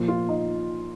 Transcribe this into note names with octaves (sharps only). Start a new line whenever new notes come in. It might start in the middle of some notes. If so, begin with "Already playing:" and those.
Already playing: A#2 F3
F4
D#4